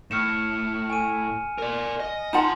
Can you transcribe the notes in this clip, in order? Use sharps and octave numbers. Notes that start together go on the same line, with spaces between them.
A2 F6 C#7 E7
G#5 D#7
A#4 D5
D#5
D#4 F4 F#5 A5 C6